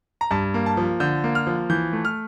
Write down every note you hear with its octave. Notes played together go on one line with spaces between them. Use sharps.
A#5
G2 A5
A#3
A5
F3
D3 G6
A#3
F6
F3
E3 G6
A3
F6